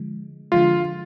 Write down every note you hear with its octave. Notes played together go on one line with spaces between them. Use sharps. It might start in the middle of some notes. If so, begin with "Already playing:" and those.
Already playing: D3 F3 G#3
D3 F3 G#3 F4